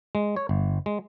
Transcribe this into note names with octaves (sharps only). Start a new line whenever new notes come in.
G#3
C#5
G1
G#3